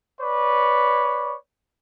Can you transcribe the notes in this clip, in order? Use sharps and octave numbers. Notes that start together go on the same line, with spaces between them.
B4 C#5 D5